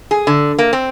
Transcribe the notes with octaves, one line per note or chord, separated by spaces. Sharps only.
G#4
D3
A#3
C4